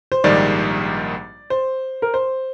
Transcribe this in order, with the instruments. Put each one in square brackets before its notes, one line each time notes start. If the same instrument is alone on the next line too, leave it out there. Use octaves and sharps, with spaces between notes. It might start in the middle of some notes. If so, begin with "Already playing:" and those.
[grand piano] C5
[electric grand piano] A#1 G#2 D#3 G3 [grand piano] D5
[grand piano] C5
A#4
C5